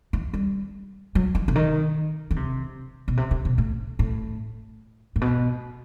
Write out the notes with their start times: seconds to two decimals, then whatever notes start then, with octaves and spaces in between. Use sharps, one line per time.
0.13 E3
0.34 G3
1.15 F#3
1.35 E3
1.48 C3
1.55 D#3
2.31 D#3
2.36 C3
3.08 B2
3.17 C3
3.31 C3
3.45 B2
3.58 A2
3.99 A2
5.16 A2
5.21 B2